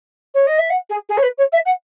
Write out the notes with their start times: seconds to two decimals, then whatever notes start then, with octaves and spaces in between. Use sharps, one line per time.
0.34 C#5
0.46 D#5
0.58 E5
0.69 F#5
0.89 G#4
1.09 G#4
1.17 C#5
1.22 B4
1.37 C#5
1.52 E5
1.65 F#5